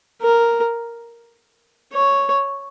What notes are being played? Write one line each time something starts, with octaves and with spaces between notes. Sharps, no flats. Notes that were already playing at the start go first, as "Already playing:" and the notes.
A#4
C#5